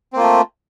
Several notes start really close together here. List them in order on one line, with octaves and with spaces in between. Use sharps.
C4 A#3 F4 A3